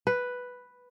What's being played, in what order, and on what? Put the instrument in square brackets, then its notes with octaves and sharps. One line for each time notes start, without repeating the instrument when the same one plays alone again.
[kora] B4